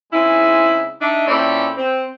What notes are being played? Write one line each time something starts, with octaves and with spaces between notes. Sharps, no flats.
C#3 G#3 C4 D#4 E4
D4 D#4 E5
A#2 C4 C#4 E4 A4 D5
C4